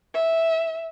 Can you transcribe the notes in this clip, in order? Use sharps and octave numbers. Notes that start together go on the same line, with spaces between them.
E5